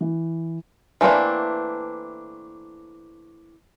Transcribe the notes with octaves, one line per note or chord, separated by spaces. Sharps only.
E3
E3 A3 A#3 C4 D4